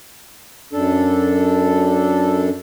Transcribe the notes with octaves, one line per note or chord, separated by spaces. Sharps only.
F#2 D4 A4